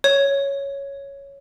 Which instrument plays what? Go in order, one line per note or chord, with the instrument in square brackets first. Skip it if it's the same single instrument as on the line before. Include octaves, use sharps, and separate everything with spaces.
[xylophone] C#5